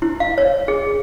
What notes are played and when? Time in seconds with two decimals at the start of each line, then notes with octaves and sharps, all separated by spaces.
0.02 E4
0.20 F5
0.38 C#5
0.68 G#4